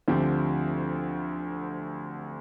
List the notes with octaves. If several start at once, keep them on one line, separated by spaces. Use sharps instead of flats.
D2 D3 F3 C4 G4